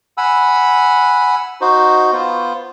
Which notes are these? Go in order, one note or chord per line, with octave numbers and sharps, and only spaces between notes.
F#5 G#5 B5 E6
D#4 F#4 C5
B3 F4 C5